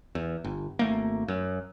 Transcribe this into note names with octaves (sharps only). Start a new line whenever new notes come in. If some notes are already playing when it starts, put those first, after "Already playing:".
E2
G1
G#1 A3 A#3
F#2